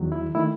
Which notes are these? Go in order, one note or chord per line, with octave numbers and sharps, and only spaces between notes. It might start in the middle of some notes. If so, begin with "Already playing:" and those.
Already playing: E2 D#3 F#3
E4
D#3 A3 E4